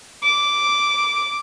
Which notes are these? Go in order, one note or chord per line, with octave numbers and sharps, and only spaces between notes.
D6